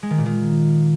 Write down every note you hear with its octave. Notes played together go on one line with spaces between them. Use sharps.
G#3
D#3
A#2
D#3